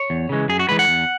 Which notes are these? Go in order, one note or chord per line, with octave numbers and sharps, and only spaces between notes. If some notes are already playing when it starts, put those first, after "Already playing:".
Already playing: C#5
E2
C#3 E3 G#3
F#2 G#4
F#4
E3 G#3 B4
F#5
E2